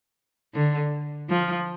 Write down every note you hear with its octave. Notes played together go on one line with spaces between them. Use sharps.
D3
F3